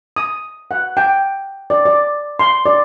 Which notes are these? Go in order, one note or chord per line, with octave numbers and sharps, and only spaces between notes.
D#6
F#5
G5
D5
D5
C6
D5